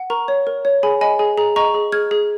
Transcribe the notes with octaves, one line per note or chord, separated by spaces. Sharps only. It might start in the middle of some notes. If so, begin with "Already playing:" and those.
Already playing: F#5
A#4 A#5 C#6
C#5
A#4
C#5
G#4 G#5 B5
D#5 G#5 B5
G#4 G#5
G#4 A#5
D#5 A#5 C#6
G#4
G#4 F6 G#6
G#4